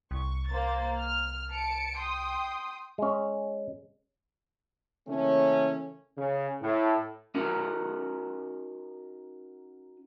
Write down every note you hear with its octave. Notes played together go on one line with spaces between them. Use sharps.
C2 C#6
A#3 C5 A6
F6
A5 C#7 D7
G5 C6 D#6
G#3 C#4
C#3 E3 A3 A#3 C#4
C#3
A2
C#4 D#4 F#4 A#4 F#5